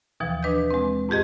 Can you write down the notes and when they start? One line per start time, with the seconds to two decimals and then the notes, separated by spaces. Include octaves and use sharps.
0.20 D#2 B2 E3 F3
0.43 D4 B4 D#5 G6
0.71 G#3 C4
1.09 F2 G#2 G4 G#4 D#5